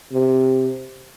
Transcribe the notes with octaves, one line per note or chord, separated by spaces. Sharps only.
C3